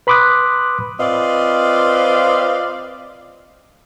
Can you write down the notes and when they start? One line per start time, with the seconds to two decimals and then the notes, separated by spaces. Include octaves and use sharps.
0.07 B4 B5 C6 D6 D#6 F#6
1.00 C4 F4 B4 D5 D#5 F5